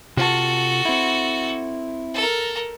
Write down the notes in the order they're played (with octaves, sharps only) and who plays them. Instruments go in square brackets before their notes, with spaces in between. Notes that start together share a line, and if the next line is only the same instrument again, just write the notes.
[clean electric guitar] C3 F4 A5 [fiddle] F#4 A4
[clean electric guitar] C4 E4
[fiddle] A4 A#4